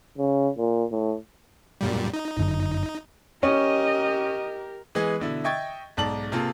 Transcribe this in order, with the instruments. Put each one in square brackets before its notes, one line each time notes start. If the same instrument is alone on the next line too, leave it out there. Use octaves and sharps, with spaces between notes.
[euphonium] C#3
A#2
A2
[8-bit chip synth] F#2 A#2 G3
D#4
[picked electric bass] G1 F#2 D3
[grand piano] C#4 [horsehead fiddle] G4 A#4 [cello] D#5
[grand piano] E3 G#3 B3 G#4
B2 D3 E4
D#5 E5 G5 C#6 G#6 A6
B1 G#2 D5 A5 F#7
C3 A#3 F4 G#4 A4